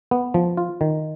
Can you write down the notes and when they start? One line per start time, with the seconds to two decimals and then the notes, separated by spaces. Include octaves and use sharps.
0.11 B3
0.34 F3
0.57 F4
0.81 D#3